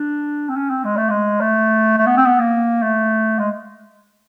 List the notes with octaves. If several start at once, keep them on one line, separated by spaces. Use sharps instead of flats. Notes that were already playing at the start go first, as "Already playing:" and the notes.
Already playing: D4
C4
C#4
C4
G#3
A3
G#3
A3
A3
B3
C4
B3
A#3
A3
G#3